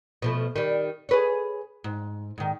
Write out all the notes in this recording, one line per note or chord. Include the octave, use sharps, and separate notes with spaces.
B2 F3 A3
D#3 G3
G#4 B4 C#5
G#2
G#2 D#3